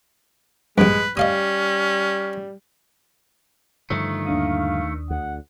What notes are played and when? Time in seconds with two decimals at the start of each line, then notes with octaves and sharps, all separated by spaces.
0.78 A#1 G2 G#3 B4
1.17 G3 C#4 D#5 F5 D#6
3.90 G2 D3 D#3 F3 A3
4.26 D#2 D4 F5 D#6
5.10 D2 F#5